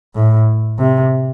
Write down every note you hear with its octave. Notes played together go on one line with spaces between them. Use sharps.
A2
C3